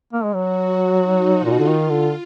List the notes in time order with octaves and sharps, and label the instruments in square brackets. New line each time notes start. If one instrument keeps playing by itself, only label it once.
[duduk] A#3
G#3
[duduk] F#3 [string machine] F#4
[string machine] D#4
F4
[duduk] A#2
B2
D3
[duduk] D#3 [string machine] F4
[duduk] D3